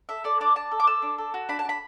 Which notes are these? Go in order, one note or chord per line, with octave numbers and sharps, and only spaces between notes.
A4 E5
A4 D5
D4 D5
D4 A5
A4
D6
A4 E6
D4
A4
F#4
D4 B5
A5
D4 B5